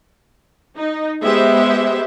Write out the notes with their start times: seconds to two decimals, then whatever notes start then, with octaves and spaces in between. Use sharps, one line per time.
0.76 D#4
1.22 G#3 B3 G4 C5 E5